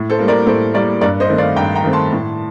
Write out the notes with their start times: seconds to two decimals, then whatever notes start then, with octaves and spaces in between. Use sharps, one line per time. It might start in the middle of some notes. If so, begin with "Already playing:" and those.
Already playing: A2
0.10 A4 C5
0.19 G3 A#3
0.28 A#4 D5
0.46 A2 A4 C5
0.74 G3 A#3 A#4 D5
1.01 G2 A#4 D5
1.20 C5 D#5
1.29 D#3 A3 C4
1.38 D5 F5
1.56 G2 G5 A#5
1.75 G5 A#5
1.84 D#3 A3 C4
1.93 A5 C6
2.11 A2